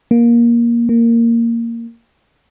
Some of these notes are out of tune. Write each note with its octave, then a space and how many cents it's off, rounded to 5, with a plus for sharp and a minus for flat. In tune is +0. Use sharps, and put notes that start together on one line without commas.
A#3 +15
A#3 -10